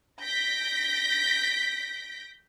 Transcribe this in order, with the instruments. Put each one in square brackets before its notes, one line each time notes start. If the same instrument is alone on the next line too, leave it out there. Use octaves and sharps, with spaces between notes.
[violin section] G6 A#6 B6 D7